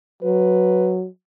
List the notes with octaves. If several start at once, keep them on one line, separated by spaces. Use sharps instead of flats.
F#3 B4